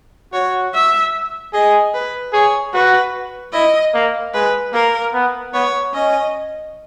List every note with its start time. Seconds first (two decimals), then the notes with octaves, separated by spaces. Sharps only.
0.33 F#4 C#5
0.74 E5
1.53 G#4 D#5
1.94 B4
2.33 G#4 C#5
2.74 F#4 B4
3.53 E4 D#5
3.94 A#3
4.34 G#3 B4
4.74 A#3 A#4
5.14 B3
5.54 B3 C#5
5.94 C#4 D#5